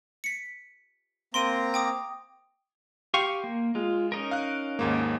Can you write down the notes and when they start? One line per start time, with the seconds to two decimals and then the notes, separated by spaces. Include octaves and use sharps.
0.24 B6 C#7
1.34 A#3 C4 A#5 C6 D7 D#7
1.74 G5 D6 D#6
3.14 G4 F5 G5 C6 C#6 D#7
3.44 A#3
3.75 G#3 F4
4.12 C#4 D#4 A#4
4.31 F5 F#6
4.79 D#2 G#2 A#3